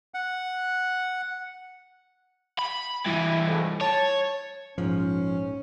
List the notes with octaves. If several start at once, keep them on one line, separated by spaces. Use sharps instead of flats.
F#5
B5
G2 E3 E4
G#2 F3 A3
C#5 A5
A#1 G#2 F3 C#4